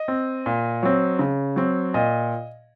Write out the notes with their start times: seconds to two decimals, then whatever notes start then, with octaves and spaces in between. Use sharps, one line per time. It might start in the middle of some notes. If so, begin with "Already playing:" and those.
Already playing: D#5
0.08 C4
0.46 A#2
0.83 F#3 C4
1.19 C#3
1.56 F#3 C4
1.94 A#2 D#5